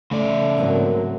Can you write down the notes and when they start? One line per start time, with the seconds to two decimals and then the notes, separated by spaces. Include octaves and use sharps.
0.11 C#3 A3 D5
0.58 G#2 F#3 A#3 C4 A#4